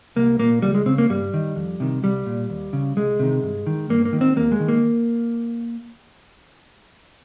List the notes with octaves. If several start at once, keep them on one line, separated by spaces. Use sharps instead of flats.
C2 A#3
A#2 A#3
C#2 G3
G#3
C#3 C4
A#3
G2 G3
D#3
F2
C3 D#3
C2 G3
A#2
D#2
C#3
C2 G#3
C3 D#3
G2
D#3
G2 A#3
A#3
D#3
C4
D#2 A#3
G#3
D#3
A#3